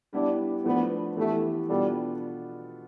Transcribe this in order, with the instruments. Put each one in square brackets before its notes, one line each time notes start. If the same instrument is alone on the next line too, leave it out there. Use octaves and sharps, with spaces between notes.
[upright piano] G3 B3 E4 G4 [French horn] D4
[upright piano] F3 A3 D4 [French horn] B3
[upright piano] E3 B3 E4 G4 [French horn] A3
[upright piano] B2 B3 D4 F4 A4 [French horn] G3